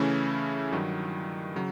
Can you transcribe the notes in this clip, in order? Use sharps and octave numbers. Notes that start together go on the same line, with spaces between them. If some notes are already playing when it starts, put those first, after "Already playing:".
Already playing: C#3 E3 A3 C#4 E4
G2 D#3 F#3
C#3 F#3